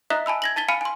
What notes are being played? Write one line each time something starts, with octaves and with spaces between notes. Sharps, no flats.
D#5 E5 A#5 D#6 F#6 B6
G#5 A5 B5 E6
G#6 A#6 F#7
A5 A6 B6 G7
F5 G#5 B5 F6 C#7 D#7
G#5 C6